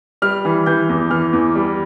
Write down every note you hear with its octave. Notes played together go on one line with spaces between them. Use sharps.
G3 F6
E3
E3 G6
E2
E3 F6
E2
G3